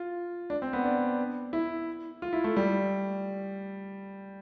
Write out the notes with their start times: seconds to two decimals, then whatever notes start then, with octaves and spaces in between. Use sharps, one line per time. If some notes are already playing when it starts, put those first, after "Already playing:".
Already playing: F4
0.50 D4
0.62 C4
0.73 B3
0.84 D4
1.53 E4
2.22 F4
2.33 E4
2.44 A3
2.57 G3